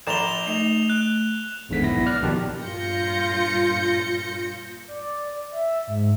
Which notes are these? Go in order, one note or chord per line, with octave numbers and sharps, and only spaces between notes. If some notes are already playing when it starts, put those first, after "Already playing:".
A#1 D5 A#5 E7 F7 G7
A3 D#4 F7
F#6
G#1 E2 G#2 D3 B6
B1 B3 E4 A#6
D5 F6 F#6
A#1 B2 D#3 G4 A5
G2 A#2 F4 G6 A#6 C#7
D5
E5
G#2